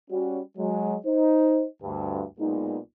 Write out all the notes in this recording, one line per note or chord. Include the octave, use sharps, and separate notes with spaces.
G3 C#4 F#4
F#3 G#3
D#4 C5
D2 G2
B1 A#2 G#3 B3 D#4